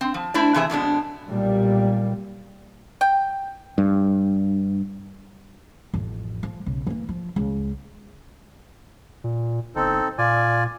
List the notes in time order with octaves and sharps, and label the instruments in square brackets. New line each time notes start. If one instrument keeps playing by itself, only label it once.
[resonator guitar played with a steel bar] C4
F3
A3 D4 E4 C5 D5
C3 E3 G#4 E5
F2 B2 G#3 D4
[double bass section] B1 A#2 G3
[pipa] G5
[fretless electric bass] G2
[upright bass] A1 F2
F3
B1 C#3
E3 A#3
F3
C#2
[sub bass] A#2
[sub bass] G1 [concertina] C4 D#4 A4
[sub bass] A#2 [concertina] F4 D5 G#5